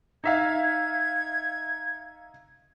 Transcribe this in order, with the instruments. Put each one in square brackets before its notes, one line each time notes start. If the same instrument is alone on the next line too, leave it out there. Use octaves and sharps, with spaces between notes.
[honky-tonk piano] D#4 E5 F5 [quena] G#6